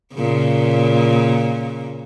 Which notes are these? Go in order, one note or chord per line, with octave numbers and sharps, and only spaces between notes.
A#2 C#3